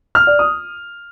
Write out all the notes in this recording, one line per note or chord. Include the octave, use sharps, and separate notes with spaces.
F6
D5
D#6